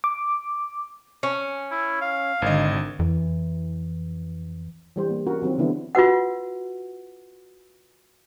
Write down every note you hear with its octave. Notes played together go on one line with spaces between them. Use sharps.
D6
C#4
E4
F5
G#1 D3 D#5
F2 E3
E3 G3 C5
A#3
C#4 F4 F#4 A#4
D#3 F#3 C4 F4
D3 E3 G3 B3 D4 E4
F4 F#4 B4 F#5